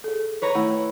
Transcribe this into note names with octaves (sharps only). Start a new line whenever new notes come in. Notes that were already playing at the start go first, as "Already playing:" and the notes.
G#4 A4
B4 C#5 A#5
D#3 A3 E4 F#5